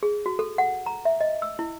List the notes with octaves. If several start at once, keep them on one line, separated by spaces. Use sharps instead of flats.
G#4
F#4
A4
F#5
A#5
E5
D#5
E6
E4